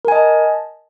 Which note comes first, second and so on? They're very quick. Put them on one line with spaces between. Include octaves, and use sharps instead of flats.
A#4 G#5 D#5 A5